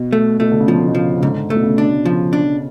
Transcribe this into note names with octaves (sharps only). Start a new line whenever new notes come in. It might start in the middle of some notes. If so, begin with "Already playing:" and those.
Already playing: B2
A3
B2 A3
D3
C#3
B2 F3
B2
C#3 F3
C#3
G#2 D3
A3
B2
C#3
D4
C#3 F3
D4